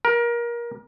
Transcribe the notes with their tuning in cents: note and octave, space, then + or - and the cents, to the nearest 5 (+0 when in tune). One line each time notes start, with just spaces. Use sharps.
A#4 +25